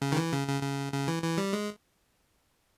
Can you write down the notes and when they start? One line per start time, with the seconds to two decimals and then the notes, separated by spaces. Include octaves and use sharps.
0.02 C#3
0.12 D#3
0.17 E3
0.32 C#3
0.47 C#3
0.62 C#3
0.92 C#3
1.08 E3
1.23 E3
1.38 G3
1.53 G#3